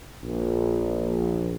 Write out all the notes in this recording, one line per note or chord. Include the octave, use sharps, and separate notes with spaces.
A#1